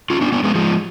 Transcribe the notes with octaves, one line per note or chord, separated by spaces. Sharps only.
C#4 F4
B3 D4
B3 D4
G#3 B3
F3 G#3